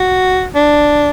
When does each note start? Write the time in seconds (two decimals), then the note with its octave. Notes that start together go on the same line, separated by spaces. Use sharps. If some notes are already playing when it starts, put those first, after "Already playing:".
Already playing: F#4
0.55 D4